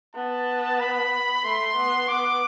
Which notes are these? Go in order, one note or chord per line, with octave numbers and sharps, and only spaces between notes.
B3 A5
B5
A3 C6
B3
B3 D6